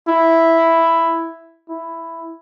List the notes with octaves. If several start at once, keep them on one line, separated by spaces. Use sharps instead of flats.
E4
E4